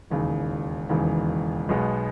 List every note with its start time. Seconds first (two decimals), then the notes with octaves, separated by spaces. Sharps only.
0.10 E1 D#2 C#3 E3
0.89 E1 D#2 C#3 E3
1.69 B1 B2 G#3 B3